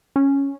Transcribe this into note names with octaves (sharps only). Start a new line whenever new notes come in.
C#4